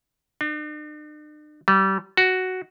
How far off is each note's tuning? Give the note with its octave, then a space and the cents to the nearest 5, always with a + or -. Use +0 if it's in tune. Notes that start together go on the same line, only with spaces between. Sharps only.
D4 +45
G3 -30
F#4 +5